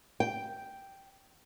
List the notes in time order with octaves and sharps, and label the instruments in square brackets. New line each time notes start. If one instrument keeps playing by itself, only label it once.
[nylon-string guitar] G5